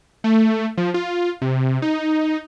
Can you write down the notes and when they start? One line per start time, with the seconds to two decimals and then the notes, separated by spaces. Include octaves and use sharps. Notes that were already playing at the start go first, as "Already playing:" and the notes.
0.24 A3
0.77 F3
0.94 F4
1.42 C3
1.82 D#4